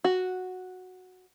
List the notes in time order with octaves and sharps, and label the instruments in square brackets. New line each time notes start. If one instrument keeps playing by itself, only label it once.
[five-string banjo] F#4